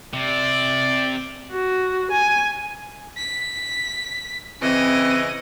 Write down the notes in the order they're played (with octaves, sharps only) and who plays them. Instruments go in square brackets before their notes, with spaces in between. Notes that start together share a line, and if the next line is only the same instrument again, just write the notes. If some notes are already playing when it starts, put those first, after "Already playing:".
[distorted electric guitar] C3 [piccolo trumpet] D5
[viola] F#4
G#5
[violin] B6
[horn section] C#3 E3 [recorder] C4 [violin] D#5 D#7